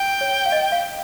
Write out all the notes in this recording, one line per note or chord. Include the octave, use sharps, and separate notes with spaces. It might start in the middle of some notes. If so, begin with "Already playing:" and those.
Already playing: G5
C#5
F5
D#5
F5